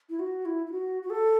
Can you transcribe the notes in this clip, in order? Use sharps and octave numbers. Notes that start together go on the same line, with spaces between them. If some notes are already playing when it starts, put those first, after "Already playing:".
E4
F#4
E4
E4
F#4
F#4
A4